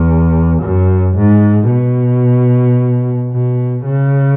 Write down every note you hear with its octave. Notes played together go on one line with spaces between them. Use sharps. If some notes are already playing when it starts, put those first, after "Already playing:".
Already playing: E2
F#2
G#2
B2
B2
C#3